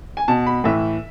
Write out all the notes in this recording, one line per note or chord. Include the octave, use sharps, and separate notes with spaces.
G#5
B2 A5
B5
A2 E3 E5